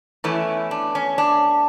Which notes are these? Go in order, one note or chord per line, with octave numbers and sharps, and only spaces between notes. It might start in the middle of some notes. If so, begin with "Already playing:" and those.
E2 E3 A3 C#4 E4
D4
C#4
D4